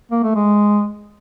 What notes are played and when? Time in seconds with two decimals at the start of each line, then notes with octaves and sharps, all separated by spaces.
0.12 A#3
0.23 A3
0.35 G#3